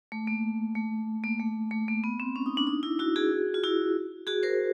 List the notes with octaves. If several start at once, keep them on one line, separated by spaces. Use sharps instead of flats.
A3
A#3
A3
A#3
A3
A3
A#3
B3
C4
C#4
D#4
D4
D#4
E4
E4 F#4
F#4 G#4
F4
E4 F#4
F#4 G#4
A#4 C5